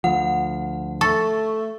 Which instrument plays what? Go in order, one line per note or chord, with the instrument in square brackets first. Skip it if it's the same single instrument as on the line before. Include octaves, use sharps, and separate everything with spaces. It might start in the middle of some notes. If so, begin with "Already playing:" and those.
[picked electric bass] D2 F3 [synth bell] F#5
[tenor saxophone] A3 [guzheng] A4 [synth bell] C#6